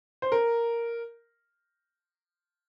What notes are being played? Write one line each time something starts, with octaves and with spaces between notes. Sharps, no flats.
C5
A#4